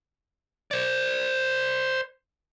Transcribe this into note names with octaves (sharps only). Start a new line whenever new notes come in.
C5 D5